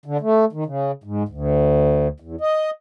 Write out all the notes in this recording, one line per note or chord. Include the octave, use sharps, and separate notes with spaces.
D3
A3
D#3
C#3
G#2
D2
E2
D#5